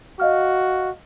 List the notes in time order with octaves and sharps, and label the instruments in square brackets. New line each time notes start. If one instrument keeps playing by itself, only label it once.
[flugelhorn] F#4 [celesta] D#5 F5 F6